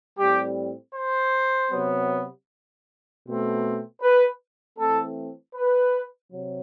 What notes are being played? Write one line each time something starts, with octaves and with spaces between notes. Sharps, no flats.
A2 G3 C4 G4
C5
C3 F#3 B3
B2 A3 C4
B4
E3 A3 C4 A4
B4
C3 F#3